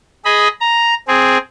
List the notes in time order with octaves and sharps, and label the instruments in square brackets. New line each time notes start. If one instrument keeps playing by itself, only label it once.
[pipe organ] G#4 D#5 B5
A#5
C4 G#4